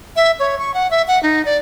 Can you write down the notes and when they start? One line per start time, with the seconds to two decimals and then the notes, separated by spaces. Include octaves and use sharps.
0.16 E5
0.39 C#5
0.59 C#6
0.74 F#5
0.91 E5
1.08 F#5
1.23 D#4
1.45 D5